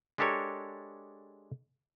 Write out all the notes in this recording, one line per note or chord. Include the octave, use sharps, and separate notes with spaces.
G#3 D4 G4 A4 A#4 C#5